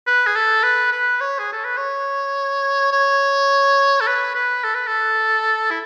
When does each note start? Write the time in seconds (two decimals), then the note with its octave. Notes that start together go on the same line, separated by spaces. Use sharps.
0.07 B4
0.27 G#4
0.35 A4
0.64 B4
0.92 B4
1.21 C#5
1.39 G#4
1.53 A4
1.65 B4
1.78 C#5
2.92 C#5
4.01 A4
4.07 B4
4.35 B4
4.64 A4
4.75 B4
4.87 A4
5.71 E4